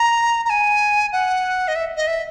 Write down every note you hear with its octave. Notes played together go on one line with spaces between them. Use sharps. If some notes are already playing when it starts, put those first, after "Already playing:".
Already playing: A#5
A#5
G#5
F#5
D#5
E5
D#5
E5